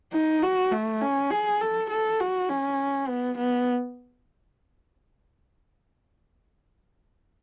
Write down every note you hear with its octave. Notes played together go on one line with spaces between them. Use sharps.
D#4
F#4
A3
C#4
G#4
A4
A4
F#4
C#4
B3
B3